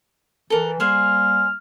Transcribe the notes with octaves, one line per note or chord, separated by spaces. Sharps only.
E3 A4 A#4
G3 A#3 G#4 C5 G#5 F6